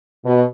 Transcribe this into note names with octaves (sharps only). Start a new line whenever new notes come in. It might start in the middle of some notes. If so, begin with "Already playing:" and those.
B2